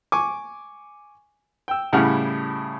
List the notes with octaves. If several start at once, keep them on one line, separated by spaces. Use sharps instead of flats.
G#5 C#6 D6
G5 E6
A2 C#3 G3 E4 F#5 F6